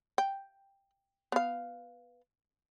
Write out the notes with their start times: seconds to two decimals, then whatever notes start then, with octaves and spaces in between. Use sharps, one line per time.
0.18 G5
1.32 B3 F5